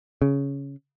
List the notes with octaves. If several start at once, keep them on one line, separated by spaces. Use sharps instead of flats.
C#3